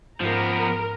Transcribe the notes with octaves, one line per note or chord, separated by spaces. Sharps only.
G#2 F3 B3 A#4 A#5 G6 C7